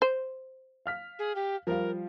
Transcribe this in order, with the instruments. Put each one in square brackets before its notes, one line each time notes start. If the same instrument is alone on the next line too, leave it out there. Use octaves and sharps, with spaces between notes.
[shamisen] C5
[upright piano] F5 F6 B6
[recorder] G#4
G4
[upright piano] F3 G3 F5 [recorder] A#4